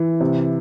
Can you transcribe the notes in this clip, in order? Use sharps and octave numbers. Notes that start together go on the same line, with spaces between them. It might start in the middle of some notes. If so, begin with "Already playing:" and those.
Already playing: E3
C3